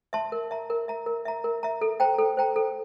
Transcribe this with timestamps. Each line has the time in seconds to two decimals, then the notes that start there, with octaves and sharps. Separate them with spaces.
0.13 E5 A5 C6
0.32 A#4
0.51 E5 A#5
0.70 A#4
0.88 E5 A#5
1.06 A#4
1.25 E5 A#5
1.44 A#4
1.63 E5 A#5
1.81 A4
2.00 C5 G5 A#5
2.18 A4
2.37 C5 G5 A#5
2.56 A4